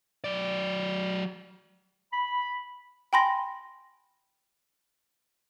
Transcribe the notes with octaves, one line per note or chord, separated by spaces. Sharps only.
F#3 D5
B5
G5 G#5 B5 C6 A#6